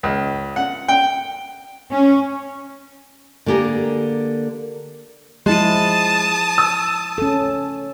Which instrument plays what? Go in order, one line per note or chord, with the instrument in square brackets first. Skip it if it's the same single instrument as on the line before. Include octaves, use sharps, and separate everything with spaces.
[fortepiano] C#2
F#5
G5
[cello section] C#4
[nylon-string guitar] D3 A#3 G4 G#4 A#4
[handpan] F3 E4 [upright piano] G#3 [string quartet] A5 D#6
[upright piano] E6
[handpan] C#4 A4